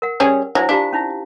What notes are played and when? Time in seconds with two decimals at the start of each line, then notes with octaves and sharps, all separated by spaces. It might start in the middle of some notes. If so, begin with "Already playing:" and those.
0.02 A#4 F#5
0.20 G3 C#4 G#4
0.55 F#3 D4 E4 C5
0.69 D4 F4 G4 F5
0.93 C#4 D#4 E4